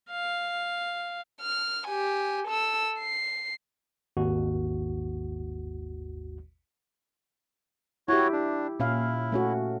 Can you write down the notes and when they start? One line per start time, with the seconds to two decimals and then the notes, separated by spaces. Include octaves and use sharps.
0.11 F5
1.41 F6
1.88 G4 G#5
2.48 A4 E6
2.99 C7
4.17 G#1 D#2 F#4
8.08 E4 F#4 G4 C#5
8.33 D4
8.80 A#2 C#4 E4 F5
9.32 A3 C#4 F#4